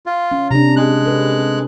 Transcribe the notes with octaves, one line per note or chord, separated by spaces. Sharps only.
F4
C#4
C3 D4 A#5
G#3 F#6
A4 B4